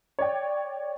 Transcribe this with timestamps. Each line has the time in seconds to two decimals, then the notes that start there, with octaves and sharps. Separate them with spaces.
0.19 C#5 D5 G5